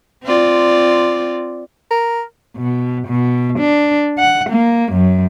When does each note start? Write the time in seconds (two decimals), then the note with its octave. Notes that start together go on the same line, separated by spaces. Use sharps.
0.24 C4 F4 D5
1.91 A#4
2.57 B2
3.07 B2
3.60 D4
4.18 F#5
4.50 A#3
4.93 F#2